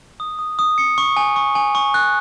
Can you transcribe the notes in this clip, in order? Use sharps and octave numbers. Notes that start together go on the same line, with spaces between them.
D#6
D#6
D#6
C#7
C#6
G#5
C#6
G#5
C#6
F#6